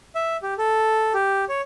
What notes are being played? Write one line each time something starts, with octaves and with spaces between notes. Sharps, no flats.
E5
G4
A4
G4
C#5